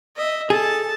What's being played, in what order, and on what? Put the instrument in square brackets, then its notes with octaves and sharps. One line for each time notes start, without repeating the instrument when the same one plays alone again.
[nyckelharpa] D#5 E5
[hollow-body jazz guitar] G#4 [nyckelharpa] A4 A5